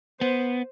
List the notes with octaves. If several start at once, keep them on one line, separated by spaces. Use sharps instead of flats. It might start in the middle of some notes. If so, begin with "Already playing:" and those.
B3 C5